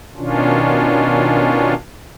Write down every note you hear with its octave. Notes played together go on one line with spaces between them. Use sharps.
B2 D#3 C#4 D4 F4